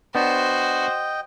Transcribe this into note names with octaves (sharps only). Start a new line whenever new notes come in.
B3 D4 F#4 C5 D#5 G5